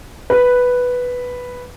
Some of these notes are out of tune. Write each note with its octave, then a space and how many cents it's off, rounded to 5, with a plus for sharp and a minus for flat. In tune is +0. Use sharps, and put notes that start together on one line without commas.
B4 +0